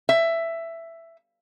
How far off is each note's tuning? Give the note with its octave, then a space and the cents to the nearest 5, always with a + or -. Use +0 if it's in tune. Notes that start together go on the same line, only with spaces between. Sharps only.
E5 +10